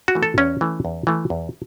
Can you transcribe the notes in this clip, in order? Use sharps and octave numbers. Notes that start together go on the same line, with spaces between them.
F#4
E3 A3
A4
E2 C#4
E3 A3
E2
E3 A3
E2